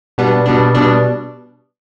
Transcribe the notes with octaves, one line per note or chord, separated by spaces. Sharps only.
B2 G3 B3 D4
B2 G3 B3 D4
B2 G3 B3 D4